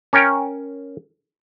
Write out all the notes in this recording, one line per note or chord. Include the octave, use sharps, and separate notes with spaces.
C#4 A#4 C#5 G5